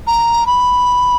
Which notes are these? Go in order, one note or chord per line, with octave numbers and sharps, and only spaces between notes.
A#5
B5